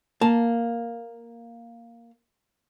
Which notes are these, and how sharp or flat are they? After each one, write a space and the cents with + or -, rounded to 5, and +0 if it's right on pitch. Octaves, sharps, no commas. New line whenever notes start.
A#3 +0 A5 +0